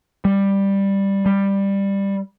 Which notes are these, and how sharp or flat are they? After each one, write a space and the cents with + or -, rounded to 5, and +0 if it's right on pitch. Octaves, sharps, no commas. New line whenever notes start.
G3 +5
G3 +10